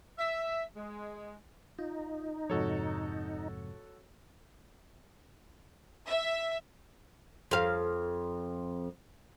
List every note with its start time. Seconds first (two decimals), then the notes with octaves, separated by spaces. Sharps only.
0.19 E5
0.76 G#3
1.79 D#4 F4
2.50 F2 G#2 C3 F#4 A4 C#5
6.07 E5
7.51 F2 F5